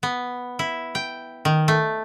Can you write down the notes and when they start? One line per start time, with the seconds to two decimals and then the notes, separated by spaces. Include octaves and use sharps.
0.03 B3
0.59 E4
0.95 G5
1.45 D#3
1.68 A3